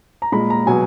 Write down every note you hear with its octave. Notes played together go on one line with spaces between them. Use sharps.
A#5
A#2 G#3 B5
A#5
B2 F#3 G#5